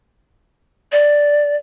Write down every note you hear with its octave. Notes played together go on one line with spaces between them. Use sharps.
D5